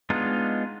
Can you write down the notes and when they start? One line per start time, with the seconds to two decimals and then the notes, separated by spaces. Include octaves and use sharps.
0.10 G#3 B3 D4 D#4 F4